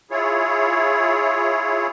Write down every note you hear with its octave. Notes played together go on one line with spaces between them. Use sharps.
E4 F4 G#4 C#5